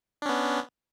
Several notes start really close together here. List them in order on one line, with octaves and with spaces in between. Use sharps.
D4 C#4 B3